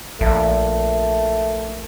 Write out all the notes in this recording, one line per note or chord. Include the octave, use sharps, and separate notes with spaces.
A#1 A3